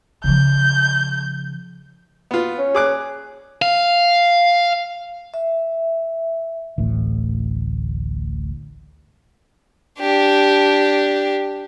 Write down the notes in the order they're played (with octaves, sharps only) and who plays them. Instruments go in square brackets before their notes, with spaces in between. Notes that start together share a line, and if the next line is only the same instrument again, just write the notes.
[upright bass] C#3 F3 [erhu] G6
[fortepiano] B3 F4
[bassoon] C#4
[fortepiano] G#4 D6 F#6
[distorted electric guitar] F5
[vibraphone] E5
[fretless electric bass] D1 A1 A2
[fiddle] D4 G4